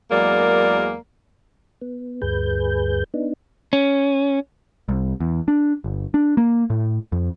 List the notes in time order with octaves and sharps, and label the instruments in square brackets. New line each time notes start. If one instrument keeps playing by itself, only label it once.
[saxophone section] E2 F#3 G#3 A#3 A#4 D5
[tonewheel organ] B3
D2 G2 G#4 B4 G6
B3 D4 D#4
[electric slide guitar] C#4
[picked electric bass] C2
E2
D4
G1
D4
A#3
A2
F2